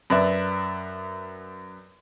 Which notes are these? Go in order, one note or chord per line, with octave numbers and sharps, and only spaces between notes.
F#2 B4 D5 E5